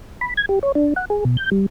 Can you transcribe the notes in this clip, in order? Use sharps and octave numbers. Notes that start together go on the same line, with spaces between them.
B5
G#6
G4
C#5
D4
F#5
G#4
B2
G6
G3